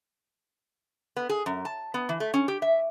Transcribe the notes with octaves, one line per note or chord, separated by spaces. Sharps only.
B3
G#4
F#2
A5
B3
E3
A3
C#4
G4
E5